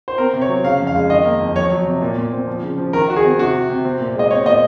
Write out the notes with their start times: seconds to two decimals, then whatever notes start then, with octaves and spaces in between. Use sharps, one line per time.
0.08 C5
0.18 C4 A#4
0.33 C3
0.41 C#5
0.49 F#3
0.64 C#3 F5
0.80 F2
0.87 F5
0.95 G#3
1.10 D#3 D#5
1.25 A#3
1.40 F2
1.56 F2 C#5
1.71 F#3
1.86 C3
2.02 A#2
2.17 A#2
2.32 C4
2.47 F3
2.63 C#3
2.78 F3
2.93 D#3 A#4
3.08 D#3 F#4
3.16 G#4
3.24 C4
3.39 C3 F#4
3.54 C3
3.70 C3
3.85 C4
4.00 A#2
4.15 G#3 D#5
4.31 C4 C#5
4.46 A#2 D#5